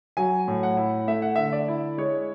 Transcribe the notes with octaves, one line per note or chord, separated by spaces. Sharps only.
F#3 G#5
A2
F#5
E4
A3 E5
F#5
D3 E5
D5
E4
G#3 C#5